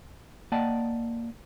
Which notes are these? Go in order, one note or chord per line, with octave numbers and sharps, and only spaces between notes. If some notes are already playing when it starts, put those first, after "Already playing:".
A#3 D5 D#5 F#5 G5 A5